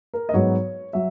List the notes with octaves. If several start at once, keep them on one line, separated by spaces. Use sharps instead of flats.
A#4
D#5
G#2 F#3 B3 C#5
F#3 E5